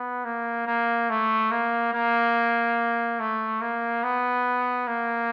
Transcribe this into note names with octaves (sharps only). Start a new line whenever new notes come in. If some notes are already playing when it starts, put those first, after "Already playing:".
Already playing: B3
A#3
A#3
A3
A#3
A#3
A3
A#3
B3
A#3